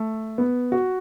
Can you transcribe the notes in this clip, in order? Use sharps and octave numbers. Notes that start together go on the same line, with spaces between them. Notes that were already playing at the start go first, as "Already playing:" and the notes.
Already playing: A3
B3
F#4